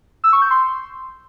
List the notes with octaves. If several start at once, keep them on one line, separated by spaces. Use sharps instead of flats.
E6
C#6
G6
C6